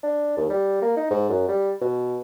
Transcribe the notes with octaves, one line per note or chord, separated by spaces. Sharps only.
D4
D#2
G3
A#3
D#4
G#2
F#2
G3
B2